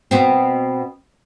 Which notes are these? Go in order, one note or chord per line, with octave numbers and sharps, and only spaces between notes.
B2 B3 C4